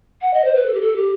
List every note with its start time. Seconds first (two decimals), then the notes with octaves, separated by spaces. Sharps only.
0.21 F#5
0.33 D#5
0.44 C5
0.55 B4
0.66 A4
0.74 G4
0.80 A4
0.95 G4